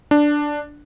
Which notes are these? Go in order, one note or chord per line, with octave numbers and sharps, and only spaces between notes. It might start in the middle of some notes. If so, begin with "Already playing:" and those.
D4